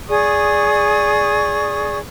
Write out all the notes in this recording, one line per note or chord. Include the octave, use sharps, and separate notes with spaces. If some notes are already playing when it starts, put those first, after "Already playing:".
G#4 D5 C#6 D#6